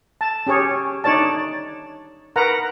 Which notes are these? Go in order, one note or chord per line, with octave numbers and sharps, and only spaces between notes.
A5
C#4 G4 G#4 C#5
D4 D#4 C#5 D5 A5
A#4 B4 F#5 A#5